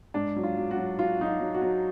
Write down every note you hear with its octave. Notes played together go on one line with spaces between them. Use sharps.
G#2 D4
F#3
F4
F#3
F#4
F#3
F#3 F4
F#3 D#4
F4
F#3
F#4
F#3